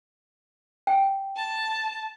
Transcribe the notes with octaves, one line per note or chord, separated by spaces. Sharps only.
G5
A5